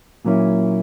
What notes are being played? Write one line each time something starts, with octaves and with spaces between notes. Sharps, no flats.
A#2 F#3 A#3 C#4 E4